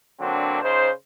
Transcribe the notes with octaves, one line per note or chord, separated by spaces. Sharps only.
D3 F#3 A#3 C4 D4
C#3 D#4 C5